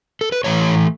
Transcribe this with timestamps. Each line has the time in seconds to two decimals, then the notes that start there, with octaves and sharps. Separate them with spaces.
0.21 A4
0.32 B4
0.44 A2 E3 A3 C#5